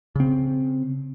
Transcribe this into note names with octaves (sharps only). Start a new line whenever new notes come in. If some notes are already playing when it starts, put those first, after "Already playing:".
C#3 C4